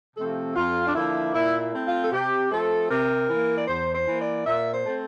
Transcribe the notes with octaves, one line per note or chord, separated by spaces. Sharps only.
C3 F3 A3 C4 A4
F2 F4
D4
D3 F3 A#3 E4
A#2 E4
E4
A3 C4
F4
A4
C3 G4
F3 A3 C4 A4
C3 A#4
E3 A#3
D5
E2 C5
C5
E3 A#3
D5
A#2 E5
C5
A3 C4